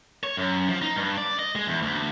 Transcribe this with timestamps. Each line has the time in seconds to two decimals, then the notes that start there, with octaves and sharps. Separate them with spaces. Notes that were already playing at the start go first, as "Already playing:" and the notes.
0.24 C#5
0.37 F#2
0.69 F3
0.82 D#4
0.96 G2
1.17 D5
1.39 D#5
1.55 G#3
1.67 E2
1.82 D2